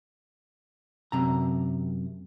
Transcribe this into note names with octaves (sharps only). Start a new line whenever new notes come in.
F#2 C3 A#5